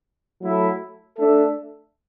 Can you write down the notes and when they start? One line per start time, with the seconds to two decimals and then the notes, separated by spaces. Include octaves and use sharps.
0.41 F#3 A3 E4 A4
1.17 A3 D4 A4 E5